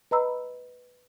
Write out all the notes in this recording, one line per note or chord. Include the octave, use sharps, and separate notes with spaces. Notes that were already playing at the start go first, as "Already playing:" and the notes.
B4 D#5 A#5 B5 E6